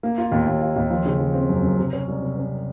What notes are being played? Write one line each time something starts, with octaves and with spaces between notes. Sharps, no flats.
A#3
F4
D#2
D#2
F4
D#2
F3
C#3
F3
C4
F#2
F#2
C3
C#4
C2
C3
C#4